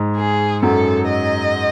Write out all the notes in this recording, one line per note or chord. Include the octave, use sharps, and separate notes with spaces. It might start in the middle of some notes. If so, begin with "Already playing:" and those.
Already playing: G#2 G#3
G#4
F#2 F#3 A4
D#5